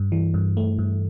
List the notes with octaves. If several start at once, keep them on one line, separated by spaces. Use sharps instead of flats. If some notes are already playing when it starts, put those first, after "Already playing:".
Already playing: G2
E3
G2
A3
G2